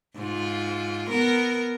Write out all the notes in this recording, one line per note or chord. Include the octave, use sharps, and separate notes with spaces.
G#2 F4
B3 A#4